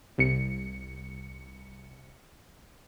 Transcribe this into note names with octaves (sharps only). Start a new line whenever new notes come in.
C2 C#7